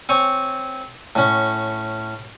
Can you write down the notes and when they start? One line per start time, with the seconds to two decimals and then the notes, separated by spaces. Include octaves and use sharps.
0.09 C4 C#5 G#5
1.15 A2 C#4